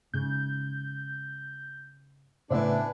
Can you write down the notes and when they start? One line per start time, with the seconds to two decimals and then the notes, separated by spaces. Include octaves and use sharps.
0.14 G#2 C#3 G6
2.50 A2 C#3 E3 A3 B3 D4 C5 E5